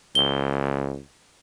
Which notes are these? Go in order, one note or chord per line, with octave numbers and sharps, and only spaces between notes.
C#2 G7